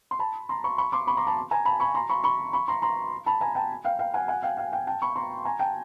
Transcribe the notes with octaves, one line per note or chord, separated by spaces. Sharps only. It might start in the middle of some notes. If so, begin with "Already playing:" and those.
C6
A5 B5
A#5 C6
B5 C#6
B5 C#6
C6 D6
B5 C#6
A#5 C6
A5 B5
G#5 A#5
A5 B5
B5 C#6
A#5 C6
B5 C#6
B5 C#6
B5 C#6
A#5 C6
A#5 C6
A5 B5
G#5 A#5
G5 A5
F5 G5
F5 G5
F#5 G#5
F#5 G#5
F5 G5
F5 G5
F5 G5
G5 A5
B5 C#6
A#5 C6
G#5 A#5
G5 A5